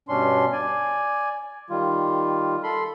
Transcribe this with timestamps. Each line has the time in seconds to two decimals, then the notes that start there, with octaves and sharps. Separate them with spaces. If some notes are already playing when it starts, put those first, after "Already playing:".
0.09 G2 B2 C#4 D4 C6
0.52 D5 G#5
1.70 D#3 G3 F4
2.63 A4 B5 C6